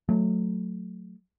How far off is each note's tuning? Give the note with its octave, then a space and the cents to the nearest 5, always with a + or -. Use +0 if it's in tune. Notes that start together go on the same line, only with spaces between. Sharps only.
F#3 -15 A3 +0